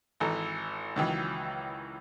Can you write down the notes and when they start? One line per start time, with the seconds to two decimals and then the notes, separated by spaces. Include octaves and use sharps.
0.20 G#1 E3 A4 A#5
0.96 C#2 D#3 E3 F#3